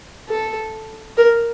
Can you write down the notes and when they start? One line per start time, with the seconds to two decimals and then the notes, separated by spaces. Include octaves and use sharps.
0.29 A4
1.18 A#4